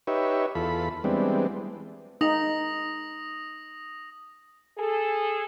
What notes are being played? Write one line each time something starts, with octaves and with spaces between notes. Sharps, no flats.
D#4 G4 B4 C#5 E5
E2 F4 A4 B5
E3 G3 G#3 B3 C4 D4
D#4 D#6 A#6 F7
G#4 A4